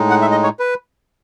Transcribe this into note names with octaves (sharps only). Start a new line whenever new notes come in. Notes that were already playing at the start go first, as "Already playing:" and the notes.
Already playing: A2 G#3 D#4
F#5
E5
D#5
C#5
B4